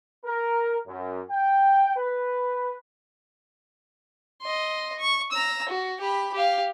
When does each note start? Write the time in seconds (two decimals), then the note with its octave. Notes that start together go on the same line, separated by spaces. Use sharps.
0.25 A#4
0.86 F#2
1.30 G5
1.97 B4
4.42 D#5 C6
5.00 C#6
5.32 A#5 E6
5.69 F#4
6.00 G4 B5
6.33 G4 F5